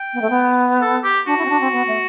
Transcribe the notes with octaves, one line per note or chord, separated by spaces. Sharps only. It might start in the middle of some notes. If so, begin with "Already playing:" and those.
Already playing: G5
B3
A3
B3
A4
G4
D4 F#4
E4
C4
D4
C4
B3
A3